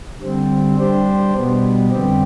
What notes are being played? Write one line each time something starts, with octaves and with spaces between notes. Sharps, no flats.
D3 G3 C4
G3 D4 G4 C5
B2 G3 B3
F2 D3 G3 C4 G4